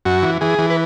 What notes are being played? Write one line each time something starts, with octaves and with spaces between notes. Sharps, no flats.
F#2 F#4
E3
E3 G#4
E3
B4